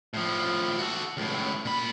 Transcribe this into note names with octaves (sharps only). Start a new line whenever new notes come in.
A2 F3
F#4 A4
C#2 A2
A#2 B5